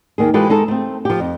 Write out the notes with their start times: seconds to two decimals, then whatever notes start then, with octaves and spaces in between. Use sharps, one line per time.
0.18 D#2 A#3 G#4
0.34 E3 G#3 F4 G4 A4 B4
0.50 G#3 D#4 A4
0.68 A3 C4
1.05 F3 G4
1.20 F2